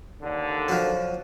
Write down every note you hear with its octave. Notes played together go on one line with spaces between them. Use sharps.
D#2 D3
F3 F#3